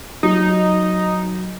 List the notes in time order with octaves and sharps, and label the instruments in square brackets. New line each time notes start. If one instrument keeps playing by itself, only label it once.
[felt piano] F#3 [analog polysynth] D#4